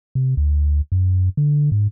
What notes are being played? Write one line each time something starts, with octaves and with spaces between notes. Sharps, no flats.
C3
D2
F#2
D3
G#2